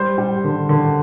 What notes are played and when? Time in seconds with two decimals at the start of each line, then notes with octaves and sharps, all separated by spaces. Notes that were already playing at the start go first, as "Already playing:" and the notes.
Already playing: G3 C5
0.18 G3
0.44 D3
0.69 D3